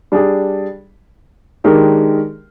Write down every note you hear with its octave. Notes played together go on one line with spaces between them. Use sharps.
G3 D4 G#4
D#3 G#3 D4 G4 A#4